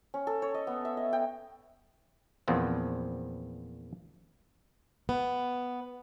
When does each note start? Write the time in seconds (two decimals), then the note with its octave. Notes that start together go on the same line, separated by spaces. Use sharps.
0.14 C#4
0.27 A4
0.42 C#5
0.54 D#5
0.67 B3
0.85 E5
0.97 D#5
1.13 G5
2.48 E2 A#2 F3 B3 C4
5.09 B3